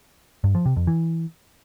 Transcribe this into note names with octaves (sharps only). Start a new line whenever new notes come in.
G2
F3
C3
F2
E3